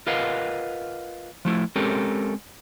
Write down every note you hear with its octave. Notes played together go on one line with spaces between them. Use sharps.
F4 A#4 B4 D#5 F5 F#5
F3 A3 E4
G#3 C4 C#4 G4 A4 A#4